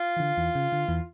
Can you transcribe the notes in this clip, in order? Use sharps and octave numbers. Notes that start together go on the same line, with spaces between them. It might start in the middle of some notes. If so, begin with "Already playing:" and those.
Already playing: F4
E3
D3
E2 E3
C#3
D3
E2 E3